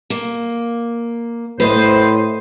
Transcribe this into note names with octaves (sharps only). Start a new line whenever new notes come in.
A#3
A2 B4 C5 D#5